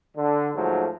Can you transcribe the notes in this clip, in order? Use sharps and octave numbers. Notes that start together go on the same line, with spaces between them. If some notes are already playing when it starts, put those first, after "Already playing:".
D3
G#2 F3 F#3 A3